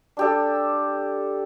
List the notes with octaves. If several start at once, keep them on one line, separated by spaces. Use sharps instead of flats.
D4 G4 A4